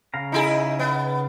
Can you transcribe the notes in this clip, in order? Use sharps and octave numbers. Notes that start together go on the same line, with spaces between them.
C#3 F5 A#5
D#4 E4 G#4
B3